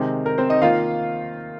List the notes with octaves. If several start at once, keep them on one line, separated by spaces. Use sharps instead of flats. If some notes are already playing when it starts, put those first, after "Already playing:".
Already playing: C3 D#3 G#3 C4
A#4
C4 C5
D#4 D#5
D#3 A#3 F4 F5